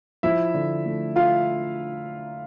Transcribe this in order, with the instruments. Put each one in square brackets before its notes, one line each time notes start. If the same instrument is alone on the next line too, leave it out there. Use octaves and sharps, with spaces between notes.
[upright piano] F3 E4 E5
D3
A3
F4 F5